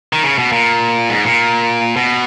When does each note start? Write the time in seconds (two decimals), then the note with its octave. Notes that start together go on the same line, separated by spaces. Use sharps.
0.13 D#3
0.23 C#3
0.38 B2
0.52 A#2
1.10 G#2
1.25 A#2
1.97 B2